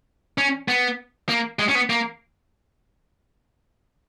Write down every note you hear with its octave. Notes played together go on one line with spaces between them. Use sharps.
C#4
B3
A#3
G#3
C#4
B3
A#3